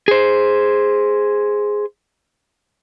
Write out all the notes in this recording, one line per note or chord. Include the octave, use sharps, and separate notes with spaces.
G#4 C5